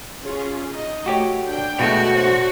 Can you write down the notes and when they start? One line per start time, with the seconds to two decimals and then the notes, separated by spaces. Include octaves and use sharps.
0.22 C#4 F4 G#4
0.69 D#4 D#5
1.06 A3 F#4 G4 C#5
1.46 D4 G5
1.79 B2 G#3 A3 F#4
2.11 D4 C5 C#5